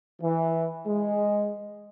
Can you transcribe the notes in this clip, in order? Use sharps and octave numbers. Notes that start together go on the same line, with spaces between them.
E3
G#3